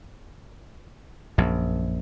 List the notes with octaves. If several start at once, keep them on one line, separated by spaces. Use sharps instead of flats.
A#1 F#2